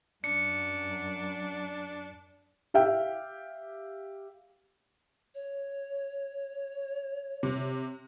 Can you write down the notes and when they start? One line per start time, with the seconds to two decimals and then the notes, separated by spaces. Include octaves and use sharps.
0.24 F#2 D4 C#7
2.74 G4 E5 F5 G5
5.35 C#5
7.43 C3